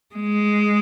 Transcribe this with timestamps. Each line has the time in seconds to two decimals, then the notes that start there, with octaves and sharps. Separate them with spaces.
0.15 G#3